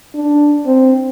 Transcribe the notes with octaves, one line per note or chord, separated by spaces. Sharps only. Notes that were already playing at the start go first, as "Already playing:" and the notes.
D4
C4